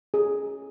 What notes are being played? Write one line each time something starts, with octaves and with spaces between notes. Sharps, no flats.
G#4